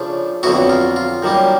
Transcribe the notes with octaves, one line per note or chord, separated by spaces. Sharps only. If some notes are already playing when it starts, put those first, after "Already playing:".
Already playing: C#3 F3 A3 D4
F2 D3 F#3 B3 E4 F#4
F4
F4
F#2 D#3 G3 A#3